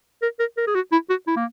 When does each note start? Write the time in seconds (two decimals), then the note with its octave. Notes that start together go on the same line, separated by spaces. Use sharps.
0.22 A#4
0.40 A#4
0.57 A#4
0.67 G#4
0.75 F#4
0.92 E4
1.10 F#4
1.27 E4
1.37 A#3